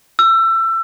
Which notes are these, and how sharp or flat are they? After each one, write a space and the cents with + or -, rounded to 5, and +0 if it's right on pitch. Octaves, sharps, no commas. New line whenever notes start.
E6 +25